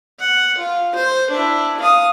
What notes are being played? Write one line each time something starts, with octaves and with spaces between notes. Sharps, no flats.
F#5
F4
C5
D4 E4
F5 D#6